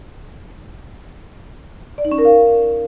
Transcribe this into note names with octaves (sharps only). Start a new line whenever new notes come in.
D5
D#4
C#4
A#4
F5